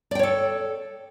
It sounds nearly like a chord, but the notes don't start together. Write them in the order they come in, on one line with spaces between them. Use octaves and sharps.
D5 G5 C#5 A4